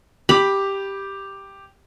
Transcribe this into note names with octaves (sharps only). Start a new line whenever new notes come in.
G4 B5 D6